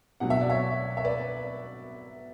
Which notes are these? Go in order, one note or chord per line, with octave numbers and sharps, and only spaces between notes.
B2 F#3 F#5
E5
D5
C#5 E5
E5
B4 D5